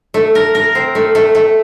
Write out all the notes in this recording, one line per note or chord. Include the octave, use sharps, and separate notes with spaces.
A3
A#4
A#4
C4
A3
A3
A3